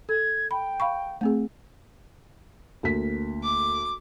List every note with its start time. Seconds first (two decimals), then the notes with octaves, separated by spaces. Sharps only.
0.09 A4 G#6
0.51 G5 B5
0.80 F5 B5 C#6
1.21 A3 C4 G#4
2.83 D2 A#3 B6
3.44 D6